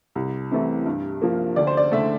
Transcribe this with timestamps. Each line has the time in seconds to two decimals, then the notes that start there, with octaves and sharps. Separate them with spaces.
0.15 C2
0.51 C3 E3 A3
0.86 G2
1.22 F3 A#3
1.56 D2 D5
1.67 C5
1.77 D5
1.92 D3 A3 E5